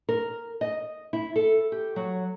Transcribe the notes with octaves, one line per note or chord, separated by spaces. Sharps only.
A#4
D#5
E4
A4
G4
F#3